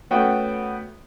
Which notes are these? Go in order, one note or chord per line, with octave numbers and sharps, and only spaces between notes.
A3 B3 C#4 F#4 G5